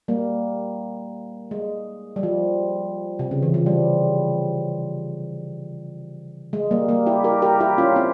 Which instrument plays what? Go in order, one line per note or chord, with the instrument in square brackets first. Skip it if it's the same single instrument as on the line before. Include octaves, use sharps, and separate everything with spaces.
[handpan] G3 A#3
G#3
G3
F3
C3
C#3
E3
F3
G3
G#3
G3 A#3
G3 A#3
E4 G4
G4 A#4
G4 A#4
E4 G4
C#4 F4
C4 E4